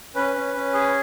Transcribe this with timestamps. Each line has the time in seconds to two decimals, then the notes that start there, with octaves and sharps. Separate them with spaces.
0.15 C#4 B4
0.34 C#4
0.53 C#4
0.73 G#4